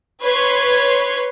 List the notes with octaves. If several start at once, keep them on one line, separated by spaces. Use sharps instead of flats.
B4 C#5 C6 G#6 C7